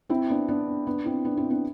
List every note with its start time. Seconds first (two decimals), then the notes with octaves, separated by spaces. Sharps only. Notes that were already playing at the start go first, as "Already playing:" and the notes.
0.09 C4 E4
0.29 B3 D4
0.48 B3 D4
0.87 B3 D4
1.06 C4 E4
1.25 B3 D4
1.37 C4 E4
1.50 B3 D4